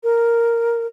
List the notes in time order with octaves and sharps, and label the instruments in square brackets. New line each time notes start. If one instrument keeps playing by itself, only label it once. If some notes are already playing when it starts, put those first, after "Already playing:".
[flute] A#4